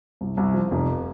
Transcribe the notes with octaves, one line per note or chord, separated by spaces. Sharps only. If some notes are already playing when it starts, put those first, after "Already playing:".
C2
C2
F3
F1